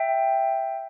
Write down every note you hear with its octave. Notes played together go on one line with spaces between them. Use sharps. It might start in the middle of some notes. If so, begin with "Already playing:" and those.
Already playing: E5 G5